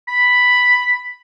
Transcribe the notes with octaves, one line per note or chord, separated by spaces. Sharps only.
B5